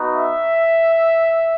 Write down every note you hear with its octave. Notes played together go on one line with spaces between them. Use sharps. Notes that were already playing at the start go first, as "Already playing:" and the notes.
Already playing: B3 D#4 F#4
E5